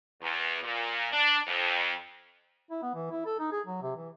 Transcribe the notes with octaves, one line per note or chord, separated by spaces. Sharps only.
E2
A#2
D4
F2
E4
B3
E3
E4
A4
D#4
G#4
F#3
C3
E3